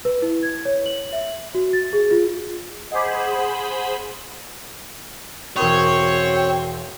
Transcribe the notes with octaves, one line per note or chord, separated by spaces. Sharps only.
B4
E4
G#6
C#5
F#7
E5
F#4
A6
G#4
F4
G#4 C5 D#5 F#5 B5 D6
E1 C4 F#4 A#4 C#5 D#6